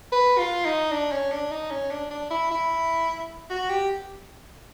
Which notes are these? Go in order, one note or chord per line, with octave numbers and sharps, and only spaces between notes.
B4
F4
D#4
D4
C#4
D4
D#4
C#4
D4
D4
E4
E4
F#4
G4